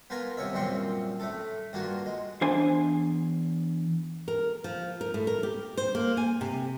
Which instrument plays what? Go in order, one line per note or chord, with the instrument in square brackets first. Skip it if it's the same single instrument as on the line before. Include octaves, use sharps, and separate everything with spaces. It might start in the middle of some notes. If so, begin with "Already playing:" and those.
[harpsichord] B3 F4 A#4 G#5 A#5
C2 C3 C#5 E5
C2 F#2 A#2 C4 C6 C#6
A2 A3 A4
G2 A#3 F4 F#4
G#3
[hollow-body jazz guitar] E2 D4 C5 G#5
[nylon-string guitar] A#4
F3
A#4
A2
A#4
G4
C5
A#3
G#5
C3